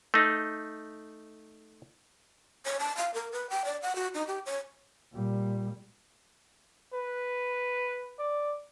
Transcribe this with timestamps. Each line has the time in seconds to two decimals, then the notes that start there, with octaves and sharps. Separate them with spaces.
0.14 A3 D#4
2.66 C#5
2.80 A5
2.97 F5
3.14 A#4
3.32 B4
3.50 G5
3.65 D5
3.82 F#5
3.96 F#4
4.14 D#4
4.27 G4
4.46 C#5
5.13 A#2 G3
6.93 B4
8.19 D5